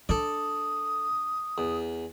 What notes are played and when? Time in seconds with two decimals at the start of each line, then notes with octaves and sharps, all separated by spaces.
0.09 D4 A4 D5 D#6
1.58 E2